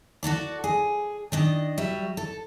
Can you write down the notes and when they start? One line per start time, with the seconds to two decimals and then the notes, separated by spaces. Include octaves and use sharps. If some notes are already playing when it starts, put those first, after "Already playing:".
0.23 F#4 G4 A4 D5
0.64 G#4
1.32 D#3 D4 D#5
1.78 F#3 G3 E5
2.17 A4